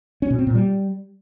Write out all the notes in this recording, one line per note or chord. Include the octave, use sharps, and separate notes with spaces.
C#4
B2
C4
A#2
G3